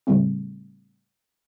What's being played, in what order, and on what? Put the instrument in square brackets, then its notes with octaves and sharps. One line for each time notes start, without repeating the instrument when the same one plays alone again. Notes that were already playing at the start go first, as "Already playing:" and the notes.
[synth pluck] A2 C#3 G3 A3 C4